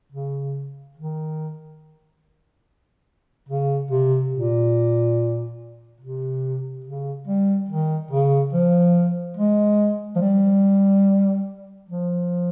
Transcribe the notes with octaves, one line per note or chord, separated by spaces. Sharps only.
C#3
D#3
C#3
C3
A#2
C3
C#3
G3
D#3
C#3
F3
G#3
F3
G3
F3